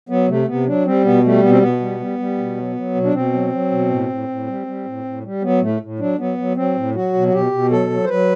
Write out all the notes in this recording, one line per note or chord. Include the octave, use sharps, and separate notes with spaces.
F#3 B3
C3 A3
C3 B3
F#3 D4
G3 C4
B2 B3
G3 A3
B2 B3
C4
B2 B3
G3
G3
G3
B2
F#3
F#3
B2
D4
B2 C4
F#3
F#3
B2
A2
A2
A2
G3
G3
A2
A2
G3
F#3 B3
A2 A3
A2
F#3 D4
F#3 B3
F#3
F#3 C4
A2
F#3 F#4
B2
F#4
B2 G4
B2
F#3 A4
F#3
C5
F#3 B4